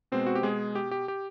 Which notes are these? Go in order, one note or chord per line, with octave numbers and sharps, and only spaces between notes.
B2 G#3 B3 C4 C5
F#4
G4
G#3 G#4
G4
G4
G4